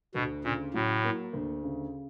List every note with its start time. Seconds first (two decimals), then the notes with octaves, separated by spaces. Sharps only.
0.15 D2 B2
0.44 A#2 C#3
0.74 A2 F#3
1.04 A#3
1.33 D2
1.63 C#3